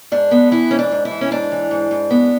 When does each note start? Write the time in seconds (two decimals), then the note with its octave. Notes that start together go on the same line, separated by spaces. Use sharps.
0.12 G#2 D4
0.31 B3
0.51 E3 E4
0.71 G#2 C#4
0.79 D4
0.91 G#2
1.05 E4
1.11 E3
1.21 C#4
1.31 G#2 D4
1.52 E3
1.71 G#2
1.91 G#2
2.10 B3